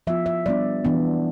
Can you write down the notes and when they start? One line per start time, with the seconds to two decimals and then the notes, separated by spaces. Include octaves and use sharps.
0.07 F3 B3 F4 E5
0.26 E5
0.46 G3 B3 D4 D5
0.85 E3 B3 D4